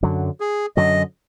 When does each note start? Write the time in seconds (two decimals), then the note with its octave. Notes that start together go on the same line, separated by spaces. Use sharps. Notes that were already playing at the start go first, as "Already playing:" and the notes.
0.03 F#2 D3 F#3
0.40 G#4
0.77 F#2 D3 F#3 D#5